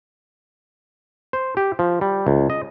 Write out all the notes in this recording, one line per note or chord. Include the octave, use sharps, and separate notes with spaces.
C5
G4
F3
G3
C#2
D#5